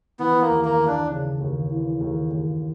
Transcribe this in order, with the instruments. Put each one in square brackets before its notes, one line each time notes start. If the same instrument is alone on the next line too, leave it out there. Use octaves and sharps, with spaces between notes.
[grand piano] E3 [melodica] B3
[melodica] A#3
[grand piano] D#2
[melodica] A#3
[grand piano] D#2
[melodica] D4
[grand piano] C#3
D#2
E3
D#2
D#2